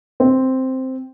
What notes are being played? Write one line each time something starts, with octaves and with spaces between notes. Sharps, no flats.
C4